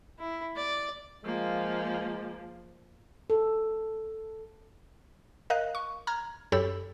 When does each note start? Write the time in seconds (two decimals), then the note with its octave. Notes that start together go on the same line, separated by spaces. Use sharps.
0.19 E4
0.56 D5
1.25 F3 G#3 A#3
3.30 A4
5.50 A#4 D#5 F5 F#6
5.75 C#6
6.07 A#5 F6 G#6
6.52 F#2 G4 A4 C#5 B5 E6